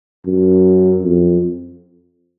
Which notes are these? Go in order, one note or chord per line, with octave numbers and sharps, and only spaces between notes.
F#2
F2